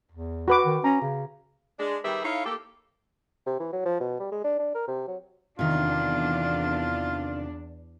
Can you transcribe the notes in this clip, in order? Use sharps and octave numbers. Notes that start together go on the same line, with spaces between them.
E2
F#4 B4 D6
D#3
C#4 A#5
C#3
G#3 D4
D#3 G3 G4 G#4 B4 E5
D#4 E4 A4 C#5 F5
A#3 G4 A4
C3
E3
F#3
F3
B2
G3
G#3
D4
D4
A#4
C3
F#3
E2 C3 D#3 D4 F4